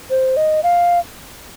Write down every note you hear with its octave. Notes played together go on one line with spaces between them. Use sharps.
C5
D#5
F5